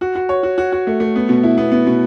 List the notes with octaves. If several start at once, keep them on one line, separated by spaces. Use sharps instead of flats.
F#4
F#4
C#5
F#4
F#4
F#4
A3
A3
B3
B2
E4
B3
B3
B2